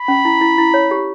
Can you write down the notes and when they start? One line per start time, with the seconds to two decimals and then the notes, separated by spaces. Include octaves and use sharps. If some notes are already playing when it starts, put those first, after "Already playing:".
Already playing: B5
0.08 C#4
0.25 E4
0.41 E4
0.58 E4
0.74 C#5
0.91 G4